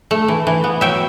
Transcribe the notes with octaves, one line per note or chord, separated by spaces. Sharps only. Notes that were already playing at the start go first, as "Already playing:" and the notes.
A3
E3
E3
B3
F#3 E5 G5